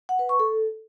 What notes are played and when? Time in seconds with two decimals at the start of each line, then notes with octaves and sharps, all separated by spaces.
0.09 F#5
0.19 B4
0.29 C#6
0.39 A4